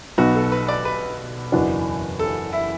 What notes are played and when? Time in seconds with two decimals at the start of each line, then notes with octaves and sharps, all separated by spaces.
0.18 B1 B2 B3 F#4
0.35 A4
0.52 B4
0.68 D5
0.85 B4
1.52 F#1 E2 E3 D4 F#4
2.19 A4
2.53 E4